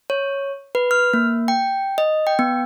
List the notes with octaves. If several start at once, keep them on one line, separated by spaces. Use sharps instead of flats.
C#5
B4
F6
A#3
G5
D#5
G5
B3